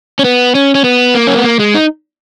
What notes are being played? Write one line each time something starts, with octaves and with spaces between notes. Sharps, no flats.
C#4
B3
C#4
C#4
B3
A#3
C#4
B3
A#3
G#3
D#4